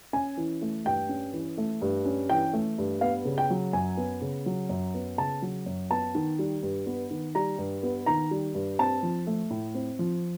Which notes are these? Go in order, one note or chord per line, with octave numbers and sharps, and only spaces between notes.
C#4 G#5
E3
A3
G2 G5
C#4
E3
A3
G2
C#4
E3 G5
A3
G2
B3 F5
C#3
G5
F#3
F#2 G#5
B3
C#3
F#3
F#2
B3
C#3 A5
F#3
F#2
B3 A5
D#3
G3
G2
B3
D#3
G3 A#5
G2
B3
D#3 A#5
G3
G2
C4 A5
F3
A3
A2
C4
F3